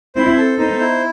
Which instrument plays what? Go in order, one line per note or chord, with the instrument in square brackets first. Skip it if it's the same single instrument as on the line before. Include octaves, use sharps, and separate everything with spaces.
[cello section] C4 E4 [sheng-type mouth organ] C5
[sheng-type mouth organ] A4
[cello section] B3 D#4 [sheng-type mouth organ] C5
[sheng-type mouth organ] E4